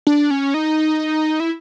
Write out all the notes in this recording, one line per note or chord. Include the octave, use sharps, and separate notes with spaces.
D4
C#4
D#4
E4